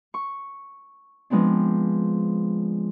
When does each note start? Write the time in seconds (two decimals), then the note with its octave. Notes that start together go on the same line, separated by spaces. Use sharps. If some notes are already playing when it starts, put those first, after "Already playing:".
0.14 C#6
1.30 F3 G#3 B3 C4 D4